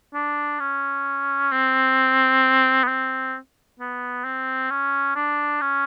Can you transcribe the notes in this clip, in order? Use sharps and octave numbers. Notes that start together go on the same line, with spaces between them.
D4
C#4
C4
B3
C4
B3
C4
C#4
D4
C#4